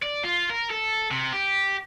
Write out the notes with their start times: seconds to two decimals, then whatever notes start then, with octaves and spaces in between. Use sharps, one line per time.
0.02 D5
0.24 F4
0.50 A#4
0.70 A4
1.11 C3
1.33 G4